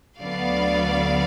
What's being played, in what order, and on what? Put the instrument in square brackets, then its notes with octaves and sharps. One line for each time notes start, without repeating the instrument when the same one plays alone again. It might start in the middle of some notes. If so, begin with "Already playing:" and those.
[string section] D2 D3 F#3 B3 D5 F5